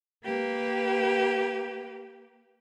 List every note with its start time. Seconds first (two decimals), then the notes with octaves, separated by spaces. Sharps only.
0.24 A#3 G4 B4